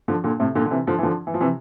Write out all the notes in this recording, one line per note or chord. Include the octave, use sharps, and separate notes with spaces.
D3 F3
A#2 D3
A2 C3
A#2 D3
D3
C3 E3
D3 F3
E3
D3 F3
E3
F3
C3 E3